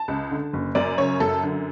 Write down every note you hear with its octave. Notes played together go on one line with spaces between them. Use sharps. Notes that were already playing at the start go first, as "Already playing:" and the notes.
Already playing: A5
C#2
D3
F#1
F#2 D5
C#3 C#5
F#2 A4
D3